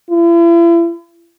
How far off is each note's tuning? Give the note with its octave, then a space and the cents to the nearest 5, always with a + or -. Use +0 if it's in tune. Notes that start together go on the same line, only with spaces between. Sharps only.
E4 +40